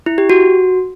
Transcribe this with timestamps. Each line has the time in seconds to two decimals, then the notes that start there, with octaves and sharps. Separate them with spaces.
0.06 E4
0.18 G4
0.30 F#4